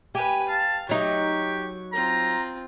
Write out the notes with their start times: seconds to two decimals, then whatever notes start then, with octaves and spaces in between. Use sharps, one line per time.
0.15 G4 B4 G#5
0.49 F5 A5
0.89 F#3 D#4 G4 C#6
1.93 C4 F4 A#5